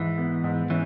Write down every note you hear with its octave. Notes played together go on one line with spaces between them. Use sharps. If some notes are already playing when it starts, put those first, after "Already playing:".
Already playing: G#2 E3
B3
G#2
E3 C#4